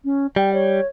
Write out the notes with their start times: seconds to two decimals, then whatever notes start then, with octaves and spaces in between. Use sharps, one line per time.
0.05 C#4
0.36 G3 G5
0.53 C#5